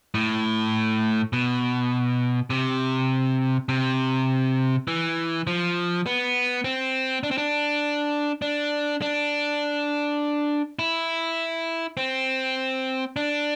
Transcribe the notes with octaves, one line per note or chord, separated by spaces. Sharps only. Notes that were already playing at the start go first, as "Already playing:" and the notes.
A2
B2
C3
C3
E3
F3
B3
C4
D4
C4
D4
D4
D4
E4
C4
D4